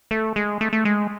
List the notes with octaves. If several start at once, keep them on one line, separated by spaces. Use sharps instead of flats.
A3
G#3
A3
A3
G#3